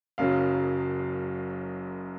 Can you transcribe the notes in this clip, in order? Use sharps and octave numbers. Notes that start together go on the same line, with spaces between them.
F#1 F#2 C#3 F#3 F5